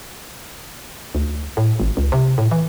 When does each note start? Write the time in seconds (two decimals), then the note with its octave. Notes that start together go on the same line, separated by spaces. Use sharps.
1.15 D2
1.57 A2
1.80 G#1
1.97 C#2
2.12 C3
2.38 A2
2.51 E3